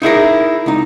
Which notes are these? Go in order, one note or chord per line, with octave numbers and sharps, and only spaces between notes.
D#4 E4 G#4 A#4
C#2 D#4